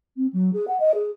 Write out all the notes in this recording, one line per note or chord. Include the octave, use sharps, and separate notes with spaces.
C4
F#3
G#4
F#5
D#5
G#4